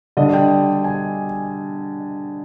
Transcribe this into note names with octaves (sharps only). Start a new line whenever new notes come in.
D3 G3 D4 D#5
G5
G#5